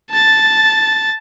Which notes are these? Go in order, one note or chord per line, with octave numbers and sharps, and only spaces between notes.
A5 A6